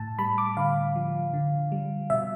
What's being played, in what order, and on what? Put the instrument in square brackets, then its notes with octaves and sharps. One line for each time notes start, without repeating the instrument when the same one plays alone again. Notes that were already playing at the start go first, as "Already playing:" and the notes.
Already playing: [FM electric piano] A2 A5
G3 B5
D6
D3 F5
F3
D3
G3
B2 E5